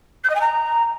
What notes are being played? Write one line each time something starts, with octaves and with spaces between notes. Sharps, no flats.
G6
D#5
G#5
A#5